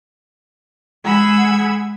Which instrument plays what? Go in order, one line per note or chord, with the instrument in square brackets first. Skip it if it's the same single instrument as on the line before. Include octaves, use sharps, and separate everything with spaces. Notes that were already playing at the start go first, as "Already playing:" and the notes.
[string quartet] G#3 G#4 F#5 B5 E6 G#6